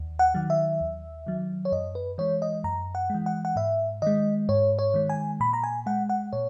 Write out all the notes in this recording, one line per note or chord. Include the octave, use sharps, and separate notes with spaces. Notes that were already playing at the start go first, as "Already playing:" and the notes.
Already playing: D#2
F#5
D#3 F#3
E5
D#2
D#3 F#3
C#5
F#2 D#5
B4
E3 G#3 C#5
D#5
F#2 A#5
F#5
E3 G#3
F#5
F#5
G#2 E5
D#3 G#3 D#5
G#2 C#5
C#5
D#3 G#3
G#5
A#2 B5
A#5
G#5
G#3 F#5
F#5
A#2 C#5